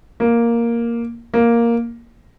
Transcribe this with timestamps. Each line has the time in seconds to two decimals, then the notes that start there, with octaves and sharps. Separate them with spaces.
0.20 A#3
1.34 A#3